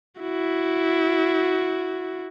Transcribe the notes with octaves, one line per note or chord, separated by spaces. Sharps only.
E4 F#4